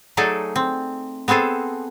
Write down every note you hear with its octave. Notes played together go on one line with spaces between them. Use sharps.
F#3 A3 D#4 G#4 A4 D5
C4
B3 C4 G#4 A4 C5